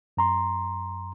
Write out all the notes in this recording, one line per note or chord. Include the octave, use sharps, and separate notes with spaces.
F#2 A#5 C6